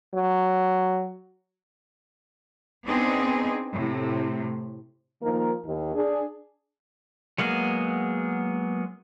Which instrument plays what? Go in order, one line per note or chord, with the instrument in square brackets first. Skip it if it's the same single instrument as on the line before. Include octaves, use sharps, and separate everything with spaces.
[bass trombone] F#3
[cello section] B3 C4 D4 D#4 G#4
A2 C3
[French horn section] D#3 F3 A#3 A#4
D#2
D4 G#4
[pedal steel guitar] F#3 G#3 A#3 B3 G#4